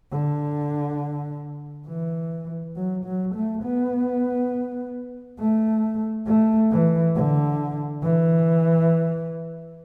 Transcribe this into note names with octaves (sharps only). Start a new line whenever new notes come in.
D3
E3
F#3
F#3
A3
B3
A3
A3
E3
D3
E3